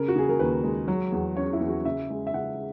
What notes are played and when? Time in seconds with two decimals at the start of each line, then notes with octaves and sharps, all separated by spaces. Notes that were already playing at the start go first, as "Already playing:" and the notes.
Already playing: C#3 A#4
0.08 F#4
0.16 C#3 G#4
0.29 A#4
0.39 D#2 B4
0.63 G#3
0.88 F#3
1.12 E2
1.36 C#4 C#5
1.53 E4
1.60 E2
1.69 F#4
1.85 C#3 E5
2.10 G#3
2.27 E5
2.33 C#3 F#5